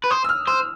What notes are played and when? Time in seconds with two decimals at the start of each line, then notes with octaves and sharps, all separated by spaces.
0.04 B4
0.10 C5 D#6
0.24 E6
0.29 F6
0.47 C5 E6